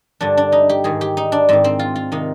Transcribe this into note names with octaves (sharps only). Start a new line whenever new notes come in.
G2 D3 D4
D4
D#4
G4
G#2 D#3 G#4
G4
D#4
D4
G#2 D#3 C4
C4
F4
F4
C3 D#3 D#4